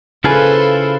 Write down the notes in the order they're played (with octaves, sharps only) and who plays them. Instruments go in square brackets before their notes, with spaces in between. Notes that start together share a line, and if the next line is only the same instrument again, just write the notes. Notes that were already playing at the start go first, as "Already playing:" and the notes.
[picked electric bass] C#3 [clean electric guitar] E4 F4 G#4 [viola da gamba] A4 C5 [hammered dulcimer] B4